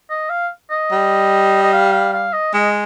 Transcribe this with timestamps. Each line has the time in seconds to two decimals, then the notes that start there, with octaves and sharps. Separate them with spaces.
0.10 D#5
0.30 F5
0.70 D#5
0.91 G3
1.63 D#5
1.73 F5
1.93 F5
2.14 F5
2.33 D#5
2.53 G#3 D#5